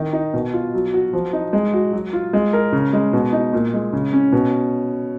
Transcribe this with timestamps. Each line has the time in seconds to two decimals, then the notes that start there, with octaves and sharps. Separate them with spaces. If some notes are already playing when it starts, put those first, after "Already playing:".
Already playing: D#3 D#4
0.13 D#4
0.34 B2
0.54 F4
0.74 F#3
0.94 F#4
1.13 F3
1.33 D#4
1.53 G#3
1.73 F#4
1.93 F#3
2.13 F4
2.33 G#3
2.53 A#4
2.72 C#3
2.93 G#3
3.13 B2
3.33 D#4
3.53 A#2
3.73 G#3
3.93 C#3
4.13 C#4
4.33 B2